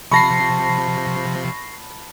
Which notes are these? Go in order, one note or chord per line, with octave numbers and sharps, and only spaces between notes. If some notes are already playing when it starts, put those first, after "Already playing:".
C3 F3 A5 B5 C#6 A#6 C7